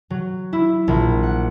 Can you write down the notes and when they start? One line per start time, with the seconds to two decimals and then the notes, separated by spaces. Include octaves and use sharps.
0.10 F#3
0.53 E4
0.88 A#1
1.23 F#5